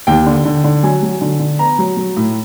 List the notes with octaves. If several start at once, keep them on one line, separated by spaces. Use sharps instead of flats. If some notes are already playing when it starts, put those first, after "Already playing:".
D#2 G5
D3
D3
D3
F#3 G#5
F#3
D3
D3
B3 A#5
F#3
F#3
A2